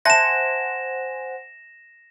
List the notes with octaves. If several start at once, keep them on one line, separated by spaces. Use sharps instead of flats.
C5 E5 F#5 G#5 A5 A#6 E7